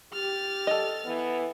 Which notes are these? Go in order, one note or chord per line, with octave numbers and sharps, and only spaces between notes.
G4 F6 A6
A4 D#5
E3 B3